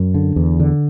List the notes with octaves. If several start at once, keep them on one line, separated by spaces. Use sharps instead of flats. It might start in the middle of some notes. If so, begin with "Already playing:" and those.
Already playing: F#2
D3
E2
D3